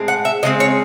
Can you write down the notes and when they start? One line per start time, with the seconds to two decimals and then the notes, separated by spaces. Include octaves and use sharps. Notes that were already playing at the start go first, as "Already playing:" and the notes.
Already playing: A2 G#3 C4
0.08 F#5
0.25 E5
0.43 C#3 G#3 C4 D#5
0.60 C#5